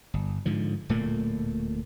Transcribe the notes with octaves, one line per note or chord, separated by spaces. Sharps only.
G1
G#2 D3 F3
D1 A#2 A3 A#3